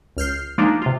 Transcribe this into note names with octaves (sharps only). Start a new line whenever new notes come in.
C#2 F6 G6 C7
F3 G#3 A#3 D4 D#4
C3 F4